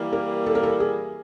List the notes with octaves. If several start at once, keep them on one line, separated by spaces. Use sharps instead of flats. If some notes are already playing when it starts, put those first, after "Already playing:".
Already playing: E3 G3 A#3
A#4
A4
A#4
A4
G#4